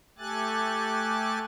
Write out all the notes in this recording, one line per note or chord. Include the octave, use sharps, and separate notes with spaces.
A3 G4 A4 G#5 F#6 A6